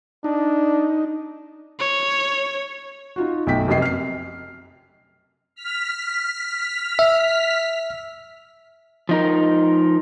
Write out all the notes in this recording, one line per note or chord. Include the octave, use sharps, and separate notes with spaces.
D4 D#4
C#5
D#4 F4 F#4
B1 A3 G5 B6
F1 F#2 D#5 C7
F6 C7
F6 B6
E5
F3 D#4 A#4